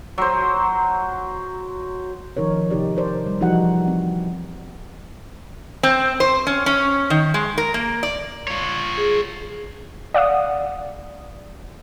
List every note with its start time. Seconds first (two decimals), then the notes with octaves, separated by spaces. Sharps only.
0.18 F#3 C5
2.37 D#3 F3 D#4 A#4 C#5
2.70 C3 D#4 G4 D5
2.97 A#4 C5 D5
3.26 G3
3.40 E3 F3 D#4 F#4 G4 F#5
3.88 C4
5.83 C4
6.20 C5
6.47 C#4
6.66 C#4
7.10 D#3
7.34 G#3
7.58 A#4
7.74 A#3
8.03 D5
8.48 F4 C#5
8.97 G#4
10.14 D5 F5 F#5 D#6